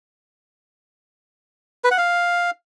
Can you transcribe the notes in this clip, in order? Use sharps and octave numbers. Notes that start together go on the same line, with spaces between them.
B4
F#5
F5